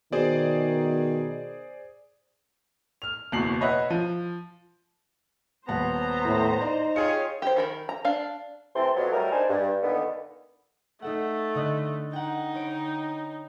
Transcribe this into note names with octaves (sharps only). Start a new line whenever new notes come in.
B2 D#3 G#4 C5 D5
F6 F7
F#1 E2 B2 C7 F#7
B4 C#5 D#5 E5 F#5 B5
F3 D#7
D#1 B3 C5 F#5 A5 A#5
A2
D#4 D5
F4 G4 G#4 C#5 D#5 C#7
G4 C5
D#3 A#4 B5
A#5
D4 F5
C3 E3 A3 C4 A5 C6
F2 B2 F3 F#3
F#3 G3 A3 A#4
D4 D#4 C5 G#5
G2
A#2 D3 D#3 B3
A3 D#4 A4 F#5
D3 D#5 F#6
D#4 F#5 G5
C#5 B5 D7